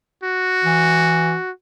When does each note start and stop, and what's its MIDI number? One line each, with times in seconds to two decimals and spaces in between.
0.23 1.51 66
0.64 1.35 52